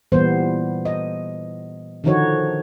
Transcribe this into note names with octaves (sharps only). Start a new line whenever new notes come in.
A#2 E3 G3 B3 C5
D#5
D3 D#3 F3 D#4 F#4 C#5